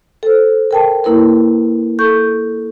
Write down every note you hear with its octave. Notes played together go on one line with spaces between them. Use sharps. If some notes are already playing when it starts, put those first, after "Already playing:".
A4 C5
A#4 G5 A5
A#3 E4 A#4 B4
A4 C#6 G6